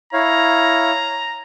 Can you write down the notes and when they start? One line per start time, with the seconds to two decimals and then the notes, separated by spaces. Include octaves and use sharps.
0.13 E4 C#5 F5 A#5